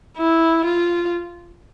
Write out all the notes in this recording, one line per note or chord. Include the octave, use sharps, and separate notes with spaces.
E4
F4